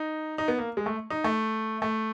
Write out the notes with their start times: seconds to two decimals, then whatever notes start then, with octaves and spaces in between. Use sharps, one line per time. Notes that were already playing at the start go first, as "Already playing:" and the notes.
Already playing: D#4
0.38 D#4
0.48 B3
0.58 A#3
0.77 G#3
0.86 A3
1.10 D#4
1.24 A3
1.82 A3